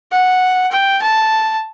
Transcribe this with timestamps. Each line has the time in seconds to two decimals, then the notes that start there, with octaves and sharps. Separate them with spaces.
0.12 F#5
0.72 G5
1.02 A5